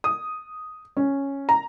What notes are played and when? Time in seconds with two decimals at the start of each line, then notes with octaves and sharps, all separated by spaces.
0.04 D#6
0.97 C#4
1.49 A#5